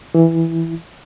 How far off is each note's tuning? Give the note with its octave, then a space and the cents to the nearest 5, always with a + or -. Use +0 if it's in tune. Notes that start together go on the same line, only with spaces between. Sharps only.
E3 +0 E4 +0